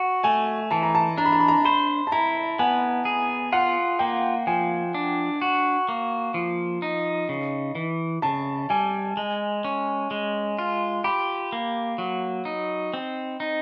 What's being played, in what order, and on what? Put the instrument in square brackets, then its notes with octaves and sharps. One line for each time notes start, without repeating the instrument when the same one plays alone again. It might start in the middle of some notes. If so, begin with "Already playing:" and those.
Already playing: [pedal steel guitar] F#4
[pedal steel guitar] A3 [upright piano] G#5
[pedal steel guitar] E3 [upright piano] A5
[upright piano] A#5
A5
[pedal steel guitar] D4 [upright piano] A#5
[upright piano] B5
A#5
B5
A#5
[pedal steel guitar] C5 [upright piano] B5
[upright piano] A5
[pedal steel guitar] E4 [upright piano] A#5
[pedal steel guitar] B3 [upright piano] G#5
[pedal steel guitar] G#4
[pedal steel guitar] F4 [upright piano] F#5
[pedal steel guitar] A#3 [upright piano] G5
[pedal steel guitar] F3 [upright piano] G#5
[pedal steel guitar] D4
F#4
A#3
F3
D#4
C#3
E3
[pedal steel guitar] C#3 [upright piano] A5
[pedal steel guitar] G3 [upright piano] G#5
[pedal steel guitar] G#3
C#4
G#3
F4
[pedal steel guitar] G4 [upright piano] B5
[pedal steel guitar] A#3
F#3
D#4
C4
D#4